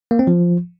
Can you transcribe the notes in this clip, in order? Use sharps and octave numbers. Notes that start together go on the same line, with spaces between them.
A#3
C4
F3